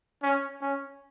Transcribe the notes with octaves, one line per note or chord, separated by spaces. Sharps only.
C#4
C#4